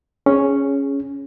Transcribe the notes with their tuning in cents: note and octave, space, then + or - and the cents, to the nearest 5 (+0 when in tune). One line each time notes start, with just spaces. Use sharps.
C#4 +0 G#4 +0